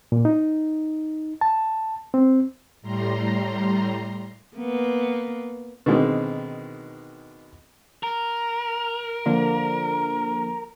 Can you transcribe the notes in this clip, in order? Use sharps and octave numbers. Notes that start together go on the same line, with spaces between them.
A#2
D#4
A5
C4
A2 G3 A#5 C6
A#3 B3
B2 D3 D#3 G#3 C4
A#4
D3 F3 A#3